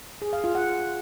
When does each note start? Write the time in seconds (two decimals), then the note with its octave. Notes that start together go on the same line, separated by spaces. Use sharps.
0.22 G#4
0.33 F5
0.44 F4
0.55 F#5